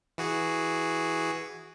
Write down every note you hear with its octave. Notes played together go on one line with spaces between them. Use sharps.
E3 F#4 G#4